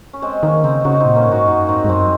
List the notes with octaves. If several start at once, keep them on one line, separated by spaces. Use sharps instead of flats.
C#4
G#3 C4
D#3 A#3 C#4
C#3 C4 D#4
C#3 D#4 F#4
C4 D#4
A#2
A#3 C#4
G#2
D#4 F#4
F#2 D#4 F#4
G#2 C4 D#4
G#2
F#2 G#3 C4